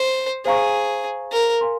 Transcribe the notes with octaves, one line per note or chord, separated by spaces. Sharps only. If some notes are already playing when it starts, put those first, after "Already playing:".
Already playing: C5
G#4 C5 F5 A#5 C#6
A#4
F5 G#5 C6